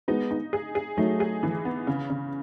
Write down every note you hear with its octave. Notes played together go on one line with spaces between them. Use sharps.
G#3 B3 D#4
D#4
G#4
G#4
F#3 A3 D#4
G#4
E3
B3
C#3
C#3